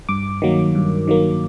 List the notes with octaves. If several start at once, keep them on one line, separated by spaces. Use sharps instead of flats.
G2 D6
D#3 F#3 A#3
G2
D#3 F#3 A#3